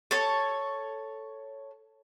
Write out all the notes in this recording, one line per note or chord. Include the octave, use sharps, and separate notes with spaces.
A4 C#5